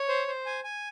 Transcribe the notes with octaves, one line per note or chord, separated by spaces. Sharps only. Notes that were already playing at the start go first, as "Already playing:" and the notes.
Already playing: C#5
C5
C5
G#5
G#5